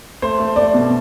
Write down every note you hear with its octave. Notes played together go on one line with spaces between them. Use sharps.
A3 C5
A3
A3 D5
B2